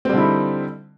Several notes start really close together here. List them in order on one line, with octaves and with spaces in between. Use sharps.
C4 G3 D3 E4 D#4